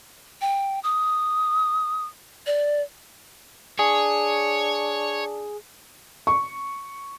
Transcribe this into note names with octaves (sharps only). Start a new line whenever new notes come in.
G5
D#6
D5
D4 G#4 C#5
C#6